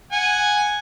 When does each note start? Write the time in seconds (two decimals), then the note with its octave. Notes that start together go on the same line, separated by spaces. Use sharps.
0.12 F#5 G#5